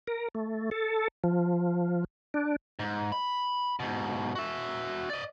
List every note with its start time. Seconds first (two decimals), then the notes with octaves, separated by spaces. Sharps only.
0.07 A#4
0.35 A3
0.71 A4
1.24 F3
2.34 D4
2.79 G#2
3.12 B5
3.80 G#2 B2
4.35 F#4 E5
5.10 D5 D#5